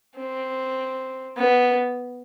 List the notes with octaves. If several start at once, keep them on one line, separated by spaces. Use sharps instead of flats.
C4
B3